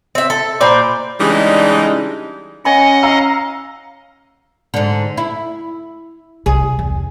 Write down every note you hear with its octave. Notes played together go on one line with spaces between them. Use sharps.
C4 E5
A4
A#2 C5 D5 A#5 B5 D6
C#3 E3 G3 G#3 D4 D#4
C#4 C#5 D#5 F#5 G#5 B5
F5 A#5 E6
G#2 D3
E4
C2 G#4
E2